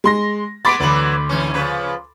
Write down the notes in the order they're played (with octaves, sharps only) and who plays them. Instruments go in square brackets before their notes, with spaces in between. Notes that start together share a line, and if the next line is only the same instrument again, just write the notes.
[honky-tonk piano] G#3 C6 A#6
[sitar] G#3 B3 [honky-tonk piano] B5 C6 D6 [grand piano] A6 B6 D7
[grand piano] D2 F#7 [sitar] E3 F#3 B3
[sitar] G#2 E3 C#4
C#3 F3 B4